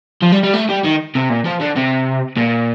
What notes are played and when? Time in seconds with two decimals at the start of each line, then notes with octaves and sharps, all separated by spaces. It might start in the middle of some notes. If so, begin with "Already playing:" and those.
0.23 F3
0.32 G3
0.43 G3
0.54 A3
0.69 G3
0.84 D#3
1.15 C3
1.29 A#2
1.45 F3
1.60 D3
1.76 C3
2.37 A#2